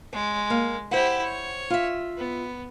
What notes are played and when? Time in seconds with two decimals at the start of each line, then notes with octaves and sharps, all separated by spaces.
0.13 G#3 C#5
0.50 A#3
0.91 E4 G4 C5 F#5
1.23 C#5
1.70 F4 E5
2.17 B3